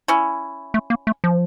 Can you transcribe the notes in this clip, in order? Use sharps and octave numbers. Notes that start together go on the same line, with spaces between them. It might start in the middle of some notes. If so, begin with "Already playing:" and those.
C#4 E4
A3
A#3
A3
F3